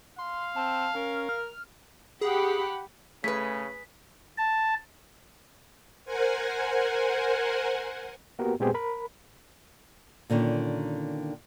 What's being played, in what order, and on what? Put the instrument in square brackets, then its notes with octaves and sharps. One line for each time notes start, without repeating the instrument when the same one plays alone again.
[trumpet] F5 [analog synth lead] C6
[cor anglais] C4 [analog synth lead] A5
[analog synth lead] C#4 [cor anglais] A#4
[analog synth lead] F6
[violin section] G4 F#5 B5 [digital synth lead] G#4
[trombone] C#3 [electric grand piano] A3 [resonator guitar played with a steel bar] G#4 B4 [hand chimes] B6
[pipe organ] A5
[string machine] A#4 C5 F#5 G#5
[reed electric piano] A#3 B3 F#4 G4 A#4
A#2 G#3 B3 C4 G4 G#4
A#4 B5
[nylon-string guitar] A#2 D3 D#3 C#4